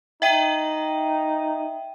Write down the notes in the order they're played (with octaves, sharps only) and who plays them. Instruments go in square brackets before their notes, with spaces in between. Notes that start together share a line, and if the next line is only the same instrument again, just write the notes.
[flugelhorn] D#4 [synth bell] E5 G5 D#7